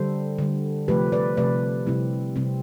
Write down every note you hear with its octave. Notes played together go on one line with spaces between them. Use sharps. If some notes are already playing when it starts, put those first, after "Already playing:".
Already playing: D3 G3 A4 C5
D3 G3
C3 F3 A3 G4 B4
B4 D5
C3 F3 A3 B4 D5
C3 G3 C4 E4
C3 G3 C4